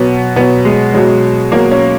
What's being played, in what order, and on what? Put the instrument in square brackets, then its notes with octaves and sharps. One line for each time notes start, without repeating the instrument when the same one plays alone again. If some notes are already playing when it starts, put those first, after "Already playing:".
Already playing: [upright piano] B2 F#3 B3
B2 B3
F#3
G#3
B2 F#3 G#3
B2 F#3 A#3
C#4